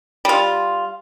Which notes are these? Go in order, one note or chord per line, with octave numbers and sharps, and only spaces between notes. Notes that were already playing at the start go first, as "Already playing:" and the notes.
G3 F4